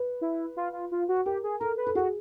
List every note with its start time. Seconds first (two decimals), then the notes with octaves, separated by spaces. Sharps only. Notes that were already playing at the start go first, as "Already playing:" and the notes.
Already playing: B4
0.21 E4
0.57 F4
0.73 F4
0.92 F4
1.09 F#4
1.26 G4 A#4
1.44 G#4
1.60 A4 A#4
1.78 B4
1.87 A4
1.95 F#4 G#4